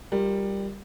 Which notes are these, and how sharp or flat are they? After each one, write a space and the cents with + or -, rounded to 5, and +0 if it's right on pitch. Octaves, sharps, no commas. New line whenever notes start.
G3 +10 F4 +25 A#4 +0